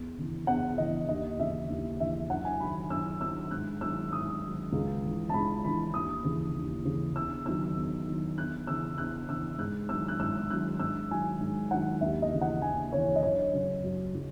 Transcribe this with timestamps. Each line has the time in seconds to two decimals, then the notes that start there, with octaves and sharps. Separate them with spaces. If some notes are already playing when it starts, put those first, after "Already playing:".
Already playing: E2
0.18 C#3 E3
0.47 E2 F#5
0.78 C#3 E3 D#5
1.09 D#2 D#5
1.39 C#3 E3 E5
1.70 D#2
1.99 C#3 E3 E5
2.30 F#2 F#5
2.45 G#5
2.60 D#3 F#3 B5
2.90 F#2 E6
3.21 D#3 F#3 E6
3.51 G#2 F#6
3.81 D#3 F#3 E6
4.12 G#2 D#6
4.43 D#3 F#3
4.72 C#2
5.03 C#3 E3
5.29 A5
5.34 C#2 B5
5.65 C#3 E3 B5
5.94 D#2 D#6
6.24 C#3 E3
6.56 D#2
6.85 C#3 E3
7.16 E2 E6
7.46 D#3 F#3 E6
7.76 E2
8.07 D#3 F#3
8.37 E2 F#6
8.67 C#3 E3 E6
8.98 E2 F#6
9.28 C#3 E3 E6
9.58 G#2 F#6
9.89 D#3 F#3 E6
10.08 F#6
10.19 G#2 E6
10.50 D#3 F#3 F#6
10.80 G#2 E6
11.10 D#3 F#3 G#5
11.40 G#2
11.71 D#3 F#3 F#5
12.01 D#2 E5
12.22 D#5
12.33 C#3 E3
12.41 F#5
12.62 D#2 G#5
12.92 C#3 E3 C#5
13.16 D#5
13.23 F#2 C#5
13.53 C#3 F#3
13.84 F#2
14.14 C#3 F#3